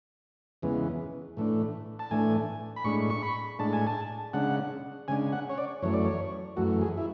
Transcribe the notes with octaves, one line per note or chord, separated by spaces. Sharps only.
E2 C#3 E3 G#3 B3
A2 E3 A3 D4
A5
A2 E3 A3 D4 G#5
B5
A2 G#3 D4 C#6
C#6
B5
A2 G#3 D4 A5
G#5
A5
C#3 G#3 D4 F#5
C#3 G#3 D4 G#5
F#5
C#5
D5
F#2 E3 A3 C#5
D5
C#5
F#2 E3 A3 F#4
G#4
E4